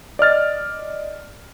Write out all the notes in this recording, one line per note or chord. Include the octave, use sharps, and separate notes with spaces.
D5 D#5 F6 A6